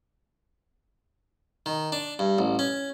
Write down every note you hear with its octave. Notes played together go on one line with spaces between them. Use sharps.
D#3
D4
G2
A1
C#4